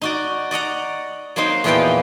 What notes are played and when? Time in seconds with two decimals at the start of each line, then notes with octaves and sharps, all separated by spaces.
0.01 D#4 F#4 D5
0.51 D5 D#5 F#5 A#5
1.36 F#3 A#3 C4 D#4 C5
1.64 E2 A#2 E3 F3 B3 G5